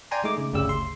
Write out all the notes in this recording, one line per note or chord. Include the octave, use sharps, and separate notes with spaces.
D5 G5 G#5 A#5 C6
G#3 A3 D#4 D6
C#3
G1 D2 C#3 G4 E6
C6